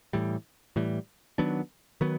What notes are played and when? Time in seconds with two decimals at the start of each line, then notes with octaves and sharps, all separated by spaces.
0.13 A2 E3 G3
0.76 A2 E3 G3
1.38 D#3 F#3 B3 D4
2.01 D#3 F#3 B3